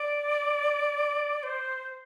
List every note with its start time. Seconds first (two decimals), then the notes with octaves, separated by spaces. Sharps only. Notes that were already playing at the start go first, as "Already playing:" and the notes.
Already playing: D5
1.43 C5